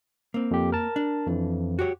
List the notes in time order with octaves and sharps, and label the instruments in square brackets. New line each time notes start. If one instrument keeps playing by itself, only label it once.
[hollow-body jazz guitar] A#3 C4
[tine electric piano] F2 G4
A#4 A5
[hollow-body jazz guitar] D4
[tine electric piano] F2 E3
[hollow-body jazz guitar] F#4 G4 C#5